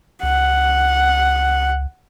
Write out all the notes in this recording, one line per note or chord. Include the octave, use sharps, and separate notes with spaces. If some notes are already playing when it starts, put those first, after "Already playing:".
C#2 F#5